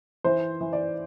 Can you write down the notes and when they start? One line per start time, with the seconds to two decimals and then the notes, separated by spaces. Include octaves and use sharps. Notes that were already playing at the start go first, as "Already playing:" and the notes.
0.24 E3 C5
0.61 E3
0.73 D5